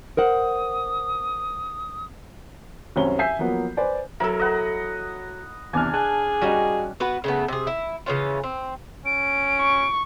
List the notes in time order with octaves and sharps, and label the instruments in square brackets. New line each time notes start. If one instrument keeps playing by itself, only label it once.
[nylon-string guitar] A#4 C5 F#5 [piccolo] D#6
[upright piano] C2 F#2 C#4 C5 G7
E5 G#5 G6 B6 C7
F3 F#3 A#3 B3
B4 C5 D5 G#5
[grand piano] F#3 [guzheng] E4 A4 [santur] A#4 E5
[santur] D#5 F#5 B5
[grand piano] E2 C3 F6 [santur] D4 G#5
[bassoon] G#4 [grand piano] A5 F#6
[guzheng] G3 C#4 D#4 [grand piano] F#4 D#5
[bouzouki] B3 F#4 B4
C#3 A3 B3
C3 G#4
E4
C#3 E3 C#4 F4
C4
[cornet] C#4 [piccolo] D7
[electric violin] C#6